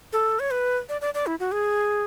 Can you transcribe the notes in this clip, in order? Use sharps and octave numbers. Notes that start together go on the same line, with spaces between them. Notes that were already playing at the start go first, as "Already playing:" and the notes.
A4
C#5
B4
D5
D5
D5
E4
F#4
G#4